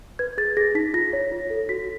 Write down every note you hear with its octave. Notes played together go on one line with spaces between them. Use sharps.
B4 G#6
G#4 A6
G#4 A#6
D#4 B6
F4 A#6
C#5
F4
A4
F#4 B6